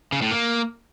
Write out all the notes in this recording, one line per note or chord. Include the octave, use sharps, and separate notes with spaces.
C#3
A2
A#3